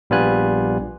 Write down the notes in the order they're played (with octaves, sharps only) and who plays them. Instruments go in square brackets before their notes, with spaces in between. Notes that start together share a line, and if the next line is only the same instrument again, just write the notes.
[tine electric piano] A#1 G3 B3 F4 G#5 F#6